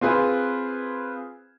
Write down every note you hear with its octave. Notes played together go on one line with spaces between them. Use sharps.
C4 F4 G#4 B4